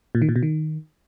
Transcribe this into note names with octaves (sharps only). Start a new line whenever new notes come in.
A#2
D#3
A#2
B2
D#3